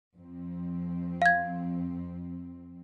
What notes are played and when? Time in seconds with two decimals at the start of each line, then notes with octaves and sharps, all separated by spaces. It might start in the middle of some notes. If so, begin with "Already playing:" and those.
0.14 F2 C4
1.22 F5 G#6